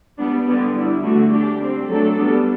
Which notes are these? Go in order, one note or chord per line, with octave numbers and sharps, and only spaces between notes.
G3 B3 D4
D3 G3 B3 D4
G3 D4 E4
D3 A3 D4 F#4
G3 D4 G4
G3 C4
F#3 A3 D4 A4
G3 B3 D4